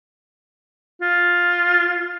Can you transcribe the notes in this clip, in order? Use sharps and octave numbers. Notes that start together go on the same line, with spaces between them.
F4